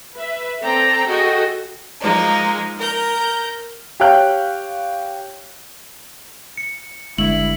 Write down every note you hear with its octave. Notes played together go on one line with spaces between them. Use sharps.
B4 E5
C4 A4 D5 G5 A#5
F#4 G#4 A4 D#5 G5
F3 G#3 A#3 D#4
A#4 A#5 G6
G4 C#5 F5 G5 F#6
C#7
G1 G2 D3 G#3 E4 F#7